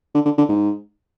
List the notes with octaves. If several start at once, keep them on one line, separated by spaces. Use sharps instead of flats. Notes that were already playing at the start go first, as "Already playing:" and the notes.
D3
D3
D3
G#2